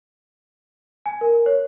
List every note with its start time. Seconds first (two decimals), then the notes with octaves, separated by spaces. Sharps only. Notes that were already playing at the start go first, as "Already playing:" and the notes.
1.06 G#5
1.21 A#4
1.46 C#5